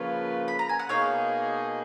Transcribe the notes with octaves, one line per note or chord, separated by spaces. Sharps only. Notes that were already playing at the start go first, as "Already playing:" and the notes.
Already playing: C#3 F3 A#3 F4 B4 C#5 F5
B5
A#5
G#5
F#5
B2 A#3 D#4 G#4 C#5 F5